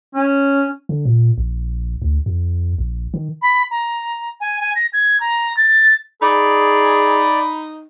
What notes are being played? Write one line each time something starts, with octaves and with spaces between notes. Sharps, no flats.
C#4
D3
A#2
A#1
D2
F2
A#1
D#3
B5
A#5
G#5
G#5
A#6
G#6
A#5
A6
D#4 G#4 D5 B5